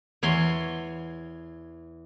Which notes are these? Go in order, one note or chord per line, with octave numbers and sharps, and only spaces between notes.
E2 C#5 C6